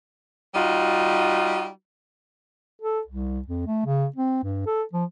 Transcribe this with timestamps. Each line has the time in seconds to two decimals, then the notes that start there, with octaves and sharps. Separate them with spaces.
0.55 G3 D#4 F4 F#4
2.82 A4
3.07 C2
3.48 F2
3.67 A3
3.86 C#3
4.16 C4
4.43 G2
4.66 A4
4.93 F3